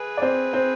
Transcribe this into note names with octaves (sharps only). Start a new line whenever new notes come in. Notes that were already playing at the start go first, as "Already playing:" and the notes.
Already playing: G#4 B4
D5
C4 C5
C4 C5